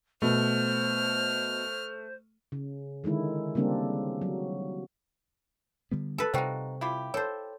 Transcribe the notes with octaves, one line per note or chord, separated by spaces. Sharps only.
B2 A3 C5 F6
C#3
D3 D#3 G#3 E4
C#3 G3 A#3 C4 D4
F#3
D3 G3 B3
A4 B4
C3 G3 D#4 F4 F#4 C5 G5
E4 F4 G4
A4 C5 C#5